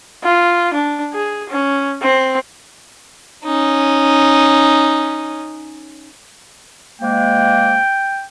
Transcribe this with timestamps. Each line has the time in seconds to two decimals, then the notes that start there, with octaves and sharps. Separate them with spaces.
0.23 F4
0.74 D4
1.13 G#4
1.49 C#4
2.02 C4
3.45 C#4 D#4
7.02 C3 G#3 A#3 G5